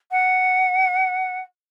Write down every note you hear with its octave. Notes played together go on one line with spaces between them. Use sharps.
F#5